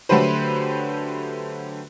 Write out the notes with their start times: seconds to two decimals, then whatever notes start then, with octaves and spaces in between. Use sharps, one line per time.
0.09 D3 F#3 A3 G4 B4 C5